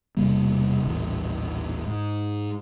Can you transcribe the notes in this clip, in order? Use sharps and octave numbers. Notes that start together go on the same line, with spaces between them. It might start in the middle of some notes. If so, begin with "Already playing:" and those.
E1 C3 G3 A#3
D#1 A1 E3
G#2